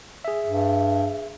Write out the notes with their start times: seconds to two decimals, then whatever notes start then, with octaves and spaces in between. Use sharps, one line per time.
0.25 G#4 E5
0.46 G2